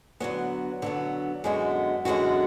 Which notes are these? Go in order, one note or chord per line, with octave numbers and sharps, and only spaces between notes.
D3 F#3 B3
D3 F#3 B3
F#2 D3 G#3 B3 F#4
F#2 D3 G#3 B3 F#4